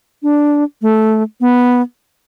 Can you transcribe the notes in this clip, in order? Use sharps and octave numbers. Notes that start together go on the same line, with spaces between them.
D4
A3
B3